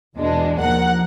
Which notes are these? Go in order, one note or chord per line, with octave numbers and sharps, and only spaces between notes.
E2 B2 G#3 D4
D#2 F3 A#4 F#5